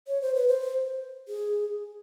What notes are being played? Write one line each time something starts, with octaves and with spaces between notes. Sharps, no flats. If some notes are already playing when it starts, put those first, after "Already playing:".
C#5
C5
B4
C5
G#4